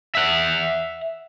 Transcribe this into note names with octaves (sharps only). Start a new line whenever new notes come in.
E5 F#5